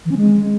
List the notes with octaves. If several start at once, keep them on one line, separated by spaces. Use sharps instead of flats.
E3
C#4
G#3